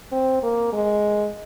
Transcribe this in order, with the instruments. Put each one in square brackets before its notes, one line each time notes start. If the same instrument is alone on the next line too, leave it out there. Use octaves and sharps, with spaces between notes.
[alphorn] C4
A#3
G#3